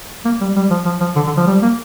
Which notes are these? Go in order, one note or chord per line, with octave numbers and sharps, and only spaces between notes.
A#3
G3
G3
F3
F3
F3
D3
D3
F3
G3
A#3